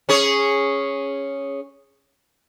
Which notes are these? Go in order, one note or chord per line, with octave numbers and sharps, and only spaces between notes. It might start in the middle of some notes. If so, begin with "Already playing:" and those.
C#4 G#4 C#5